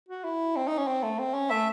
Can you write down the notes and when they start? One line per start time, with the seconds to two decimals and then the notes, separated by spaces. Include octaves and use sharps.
0.09 F#4
0.24 E4
0.56 C4
0.67 D#4
0.78 C#4
0.88 C4
1.03 A3
1.19 C4
1.34 C#4
1.49 A3 E5